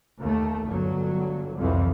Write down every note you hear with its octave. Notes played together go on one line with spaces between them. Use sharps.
D#2 A3
G1 F#3
C2 F2 E3